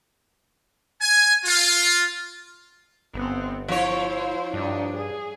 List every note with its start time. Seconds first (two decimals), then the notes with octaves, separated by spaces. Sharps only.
1.01 G#5
1.45 F4
3.14 G1 B3 C4
3.68 F3 E4 C5 C#5
4.53 G2 D4 D#4
4.94 G#4